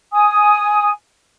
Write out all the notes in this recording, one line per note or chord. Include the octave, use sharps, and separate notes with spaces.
G#5 D#6